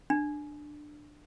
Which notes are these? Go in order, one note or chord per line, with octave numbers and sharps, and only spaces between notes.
D4